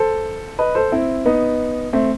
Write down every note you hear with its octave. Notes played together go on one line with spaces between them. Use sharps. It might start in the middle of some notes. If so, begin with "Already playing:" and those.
Already playing: A4 C5
B4 D#5
A4 C5
C4 E4
B3 D#4
A3 C4